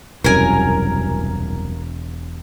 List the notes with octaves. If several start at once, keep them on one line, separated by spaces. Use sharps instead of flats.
E1 C2 F#2 A#4 G#5